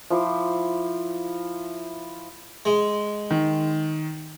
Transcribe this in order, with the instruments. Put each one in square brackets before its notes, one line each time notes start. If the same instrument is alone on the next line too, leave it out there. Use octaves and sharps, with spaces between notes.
[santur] F3 E4 C5 D6
[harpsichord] G#3
[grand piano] D#3